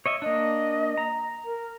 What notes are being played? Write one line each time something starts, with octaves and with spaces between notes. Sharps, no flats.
C#5 D#5 E5
A#3 D4 D#5
A#5
A#4